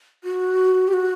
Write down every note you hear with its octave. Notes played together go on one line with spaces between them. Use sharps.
F#4
G4
F#4